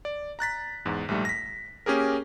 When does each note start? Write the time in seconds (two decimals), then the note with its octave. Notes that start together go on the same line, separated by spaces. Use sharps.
0.05 D5
0.39 A#5 F#6 A6 B6
0.85 E2 G#2
1.08 A#1 G#2 G3 A3
1.25 A#6 B6
1.86 A#3 C#4 G4 G#4 A#4